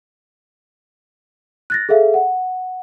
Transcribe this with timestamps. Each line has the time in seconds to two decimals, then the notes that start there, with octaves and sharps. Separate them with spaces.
1.70 F#6 A6 A#6
1.89 G#4 A4 E5 F5
2.14 F#5